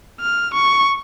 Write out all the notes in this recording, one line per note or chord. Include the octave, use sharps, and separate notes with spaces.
F6
C#6